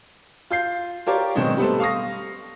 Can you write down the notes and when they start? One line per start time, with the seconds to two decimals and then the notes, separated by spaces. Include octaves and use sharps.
0.51 F4 G6 C7
1.06 F4 G4 A#4 C#5 D5
1.35 B2 D#3 F#3 G#3 C4 D#4
1.57 G3 A3 B3 A4 C5
1.80 F5 C#6 D#6 A#6